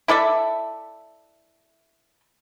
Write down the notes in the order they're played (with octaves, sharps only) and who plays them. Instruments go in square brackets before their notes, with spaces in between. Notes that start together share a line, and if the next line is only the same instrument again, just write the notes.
[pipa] E4 A4 D5 E5